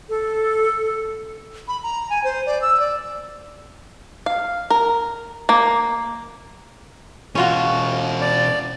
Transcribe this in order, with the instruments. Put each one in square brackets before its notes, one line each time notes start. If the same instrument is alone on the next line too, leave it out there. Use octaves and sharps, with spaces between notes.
[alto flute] A4
[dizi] B5
A#5
G#5
C5
D5
E6
D5
[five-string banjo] F5
A#4
A#3
[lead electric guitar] B2 E3 [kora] C#4 F4 F#4
[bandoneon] D5